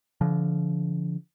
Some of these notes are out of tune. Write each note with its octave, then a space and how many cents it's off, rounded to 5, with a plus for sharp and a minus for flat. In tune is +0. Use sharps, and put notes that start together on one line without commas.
D3 -40 F3 -30